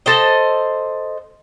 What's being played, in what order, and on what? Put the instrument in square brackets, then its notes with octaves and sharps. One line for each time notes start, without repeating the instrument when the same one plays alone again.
[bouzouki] A4 C5 D#5